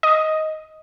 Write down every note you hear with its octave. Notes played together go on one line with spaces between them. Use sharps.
D#5